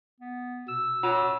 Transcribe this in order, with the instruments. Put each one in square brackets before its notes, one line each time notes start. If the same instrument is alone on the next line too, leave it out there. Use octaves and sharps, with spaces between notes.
[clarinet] B3
[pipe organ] B2 [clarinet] E6
[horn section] F#2 F#3 [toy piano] F4